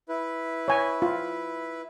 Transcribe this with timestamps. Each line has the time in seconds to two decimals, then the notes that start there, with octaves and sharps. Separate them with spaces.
0.09 E4 B4
0.68 C#5 G#5
1.02 F4